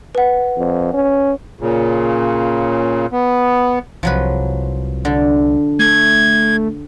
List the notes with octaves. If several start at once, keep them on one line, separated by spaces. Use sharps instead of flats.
B4 F#5
F2
C#4
A#2 C#3
B3
C2 F3 F#3 B4
D3
A3 G#6